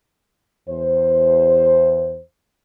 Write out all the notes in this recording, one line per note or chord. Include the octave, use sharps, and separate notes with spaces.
E2 C5